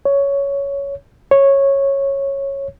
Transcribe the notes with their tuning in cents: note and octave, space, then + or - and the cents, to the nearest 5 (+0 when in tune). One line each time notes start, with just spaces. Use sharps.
C#5 +10
C#5 -10